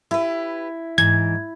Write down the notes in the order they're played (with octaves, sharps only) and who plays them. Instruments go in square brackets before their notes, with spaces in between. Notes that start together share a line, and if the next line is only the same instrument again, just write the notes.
[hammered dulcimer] E4 [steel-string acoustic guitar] G4 B4
[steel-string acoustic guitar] G#2 E3 [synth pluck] G#6